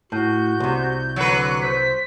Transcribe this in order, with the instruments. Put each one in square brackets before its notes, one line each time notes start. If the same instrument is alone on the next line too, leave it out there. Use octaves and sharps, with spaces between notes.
[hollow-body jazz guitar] A2 [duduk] F#4 [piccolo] G6
[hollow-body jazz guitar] C2 C3
[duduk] D3 [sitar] F#3 B4 [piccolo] F#5
[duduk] C5 [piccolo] B6